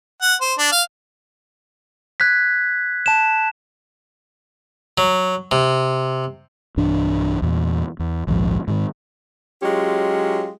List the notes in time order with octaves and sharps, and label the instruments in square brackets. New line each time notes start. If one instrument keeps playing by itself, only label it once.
[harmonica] F#5
C5
D4
F5
[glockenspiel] F#6 G#6 B6
A5 E7
[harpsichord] F#3
C3
[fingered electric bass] B1 G2 E3 D4
E2 A#2
E2
A#1 D#2 G#2 F3
G#2 D#3
[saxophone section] F#3 G#3 C#4 F4 G4